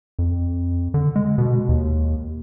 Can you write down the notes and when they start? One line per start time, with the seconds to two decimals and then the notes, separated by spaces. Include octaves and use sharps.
0.19 F2
0.94 D3
1.16 G#3
1.38 B2
1.69 D#2